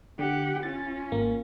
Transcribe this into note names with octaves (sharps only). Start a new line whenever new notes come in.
D3 G4 F#5
C#4 F4 A6
G#1 A#3